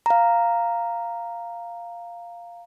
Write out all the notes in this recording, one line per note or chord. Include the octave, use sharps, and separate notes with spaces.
F5 A#5